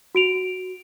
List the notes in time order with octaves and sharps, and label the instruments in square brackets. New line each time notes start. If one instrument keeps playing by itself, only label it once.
[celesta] F#4 D7 F7